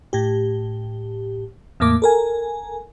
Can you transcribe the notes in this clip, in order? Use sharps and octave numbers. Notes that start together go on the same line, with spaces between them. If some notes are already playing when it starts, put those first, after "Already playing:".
A2 G4
E2 A2 A#3 D6
A4 A#4 G#5